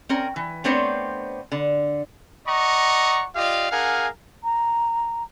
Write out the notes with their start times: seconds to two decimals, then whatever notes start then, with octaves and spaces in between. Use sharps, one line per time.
0.09 C4 C#4 A#4
0.36 E3
0.64 A3 B3 C4 D4 C5 C#5
1.52 D3
2.47 D5 D#5 F#5 A#5 C#6
3.36 F4 G4 D5 D#5 F5
3.70 D4 G#4 A#4 F5 F#5 G#5
4.44 A#5